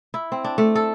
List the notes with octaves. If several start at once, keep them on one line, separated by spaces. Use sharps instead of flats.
E4
C4
D4
A3
A4